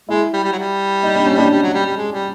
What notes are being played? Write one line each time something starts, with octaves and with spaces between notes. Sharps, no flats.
G#3 E4
G3
G3
F#3
G3
D#4
D4
C#4
D4
G3
F#3
G3
G3
G#3
G3